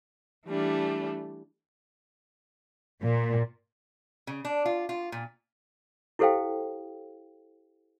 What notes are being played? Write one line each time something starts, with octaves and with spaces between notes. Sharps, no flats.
E3 G3 A3 D4
A#2
C#3
D4
F4
F4
A#2
E4 G4 A4 C5 F5 G5